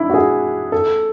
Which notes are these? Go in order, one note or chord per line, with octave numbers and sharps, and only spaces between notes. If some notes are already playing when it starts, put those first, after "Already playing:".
Already playing: D4 E4
F#4
G#4
A4